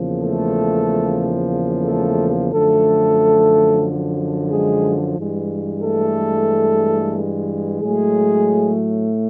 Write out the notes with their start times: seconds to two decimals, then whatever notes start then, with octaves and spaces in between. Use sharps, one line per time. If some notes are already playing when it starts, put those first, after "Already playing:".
Already playing: E2 C#3 F3 A#3
0.21 A3 A4
1.86 A3 A4
2.53 F#2 D3 F3 A3 A4
4.51 G#3 G#4
5.18 G2 E3 G#3
5.84 A3 A4
7.82 A2 F#3 G#3 A3 G#4